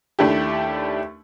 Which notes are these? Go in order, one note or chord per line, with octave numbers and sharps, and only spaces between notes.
D#2 A3 D4 E4 G4